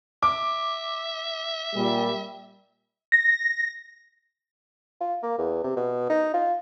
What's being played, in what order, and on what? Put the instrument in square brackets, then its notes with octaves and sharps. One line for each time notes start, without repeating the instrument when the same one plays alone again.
[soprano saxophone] E5 [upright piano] D6
[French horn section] A#2 G3
[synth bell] A#6
[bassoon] F4
A#3
E2
C3
B2
D#4
F4